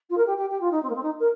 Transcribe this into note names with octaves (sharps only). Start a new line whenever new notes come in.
F4
A#4
G4
G4
G4
F4
D#4
C4
A#3
C4
D#4
A#4